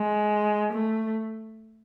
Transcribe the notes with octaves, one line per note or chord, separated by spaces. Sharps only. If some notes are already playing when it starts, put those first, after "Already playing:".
Already playing: G#3
A3